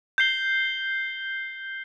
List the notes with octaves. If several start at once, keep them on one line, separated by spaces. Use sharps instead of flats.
G6 C7 G7